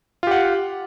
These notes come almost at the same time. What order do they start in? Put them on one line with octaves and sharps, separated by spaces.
F4 G4 F#5